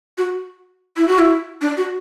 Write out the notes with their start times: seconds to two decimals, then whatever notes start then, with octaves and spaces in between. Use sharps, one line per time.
0.18 F#4
0.97 E4
1.08 F#4
1.19 E4
1.61 D4
1.77 F#4